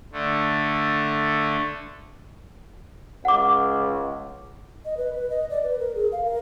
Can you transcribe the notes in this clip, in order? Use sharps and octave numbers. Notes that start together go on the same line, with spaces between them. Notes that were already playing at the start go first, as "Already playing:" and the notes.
D3 A3
C#2 F#5 D6
D#5
B4
B4
D#5
D5
B4
A#4
G#4
F5
A#4